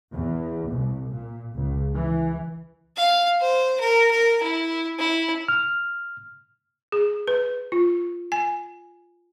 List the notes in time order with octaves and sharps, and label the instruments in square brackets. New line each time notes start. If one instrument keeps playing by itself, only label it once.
[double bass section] E2
C2
A#2
C#2
E3
[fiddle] F5
C5
A#4
A#4
E4
E4
[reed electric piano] F6
[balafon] G#4
B4
F4
G#5